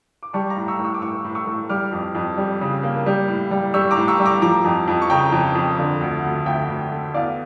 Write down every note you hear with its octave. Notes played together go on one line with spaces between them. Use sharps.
D6
G3 A5 C#6
A#5 D6
A2
C#6 E6
A2
C#6 E6
D6
A2 C#6 E6
A2
C#6 E6
A2
G3 D6 F6
F2
F2
G3
C#3
A#3
G3
A2
G3
G3 C#6 E6
A#5 D6
A2
C#6 E6
G3
A#5 D6
F3 A#5 D6
F2
F2
C#6
C#3 G5 A#5
F2
F2
D3
D2
D2
D2 E5 G5
D2
A3
E2 D5 F5